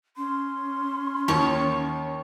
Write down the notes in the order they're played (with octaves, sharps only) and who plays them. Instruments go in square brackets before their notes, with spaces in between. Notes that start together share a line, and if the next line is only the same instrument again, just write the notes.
[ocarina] C#4 [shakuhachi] C6
[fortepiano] D#2 D#3 [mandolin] C#5 C#6